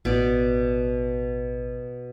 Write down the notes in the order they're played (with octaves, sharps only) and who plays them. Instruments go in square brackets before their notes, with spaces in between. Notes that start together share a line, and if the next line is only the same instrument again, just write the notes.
[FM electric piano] A1 [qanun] B2 D5